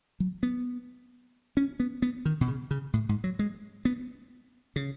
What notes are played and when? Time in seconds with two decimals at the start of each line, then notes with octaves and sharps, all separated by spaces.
0.20 F#3
0.43 B3
1.57 C#4
1.80 B3
2.02 B3
2.25 D#3
2.41 B2
2.48 C#3
2.71 C#3
2.93 A2
3.09 G#2
3.24 F#3
3.39 G#3
3.85 B3
4.76 C#3